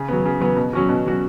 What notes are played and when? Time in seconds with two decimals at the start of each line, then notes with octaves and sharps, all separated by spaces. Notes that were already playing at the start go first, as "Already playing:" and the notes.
Already playing: C#3
0.09 F#3 B3
0.25 C#3
0.40 F#3 B3
0.56 B2
0.73 F#3 C#4 F#4
0.89 B2
1.06 F#3 C#4 F#4